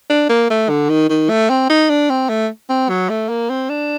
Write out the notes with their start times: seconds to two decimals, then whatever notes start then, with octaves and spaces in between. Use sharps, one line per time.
0.10 D4
0.29 A#3
0.50 A3
0.69 D3
0.89 D#3
1.10 D#3
1.29 A3
1.50 C4
1.70 D#4
1.90 D4
2.10 C4
2.29 A3
2.69 C4
2.90 F#3
3.09 A3
3.30 A#3
3.50 C4
3.70 D4